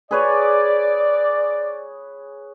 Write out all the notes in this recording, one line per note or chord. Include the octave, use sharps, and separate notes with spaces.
G#4 B4 C#5 D5